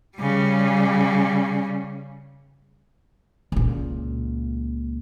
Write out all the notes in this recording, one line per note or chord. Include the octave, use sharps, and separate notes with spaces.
C#3 G3
C#2 A#2